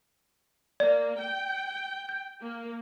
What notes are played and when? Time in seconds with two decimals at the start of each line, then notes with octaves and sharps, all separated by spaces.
0.80 A#3 D5
1.20 G5
2.09 G6
2.42 A#3